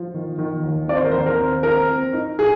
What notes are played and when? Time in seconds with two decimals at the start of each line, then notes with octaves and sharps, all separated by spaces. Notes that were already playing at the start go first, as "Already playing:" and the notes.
Already playing: F3
0.14 D#3
0.38 D#3
0.64 D#2
0.88 C4 D5
0.97 C5
1.04 A#4
1.11 D#2 C5
1.26 A#4
1.39 C4
1.63 C4 A#4
1.89 C4
2.13 D#4
2.39 G#4